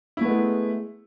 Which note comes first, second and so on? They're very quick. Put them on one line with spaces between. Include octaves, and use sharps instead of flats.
E4 A3 B3 G#3